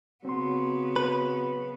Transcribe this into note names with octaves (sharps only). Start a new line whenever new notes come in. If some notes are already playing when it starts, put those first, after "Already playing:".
C#3 F#3 B3 C4 C6
B4